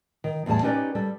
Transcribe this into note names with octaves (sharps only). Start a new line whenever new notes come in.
D#3
E2 A2 G3 G#4 A5
C#4 D#4 G4 B4 D5
G3 A4